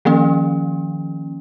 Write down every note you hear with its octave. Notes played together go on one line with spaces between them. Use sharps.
D#3 F3 A#3 C#4